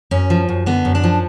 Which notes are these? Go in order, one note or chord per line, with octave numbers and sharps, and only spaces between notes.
F#2 C#4
F3
F#2
D3 B3
F#2
D4
F3